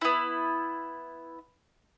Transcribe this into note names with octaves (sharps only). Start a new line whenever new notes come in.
B3 E4